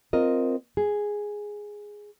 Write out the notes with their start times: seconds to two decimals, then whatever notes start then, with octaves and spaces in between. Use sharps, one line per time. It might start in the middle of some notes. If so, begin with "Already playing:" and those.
0.13 C4 F4 A#4 D#5
0.77 G#4